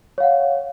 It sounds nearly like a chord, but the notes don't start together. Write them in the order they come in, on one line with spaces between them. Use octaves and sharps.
C#5 F5 F#5